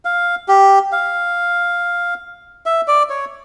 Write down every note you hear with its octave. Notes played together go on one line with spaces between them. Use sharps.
F5
G4
F5
E5
D5
C#5